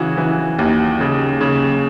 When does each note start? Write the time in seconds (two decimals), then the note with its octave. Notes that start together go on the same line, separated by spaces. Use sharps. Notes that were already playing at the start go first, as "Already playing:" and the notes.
Already playing: C#3 E3 F#4
0.17 E3
0.59 D#2
1.00 C#3
1.41 C#3